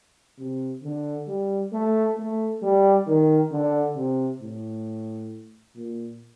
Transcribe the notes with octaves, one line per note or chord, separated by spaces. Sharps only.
C3
D3
G3
A3
A3
G3
D#3
D3
C3
A2
A#2